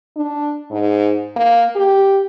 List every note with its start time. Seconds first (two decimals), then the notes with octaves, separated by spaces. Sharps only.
0.16 D4
0.71 G#2
1.36 A#3
1.76 G4